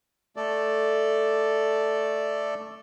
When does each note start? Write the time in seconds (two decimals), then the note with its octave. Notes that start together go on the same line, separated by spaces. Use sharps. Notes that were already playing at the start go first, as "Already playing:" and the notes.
0.36 A3 A4 D5